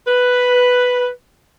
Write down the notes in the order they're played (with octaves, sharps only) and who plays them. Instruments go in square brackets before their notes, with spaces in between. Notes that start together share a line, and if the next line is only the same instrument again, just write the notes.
[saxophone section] B4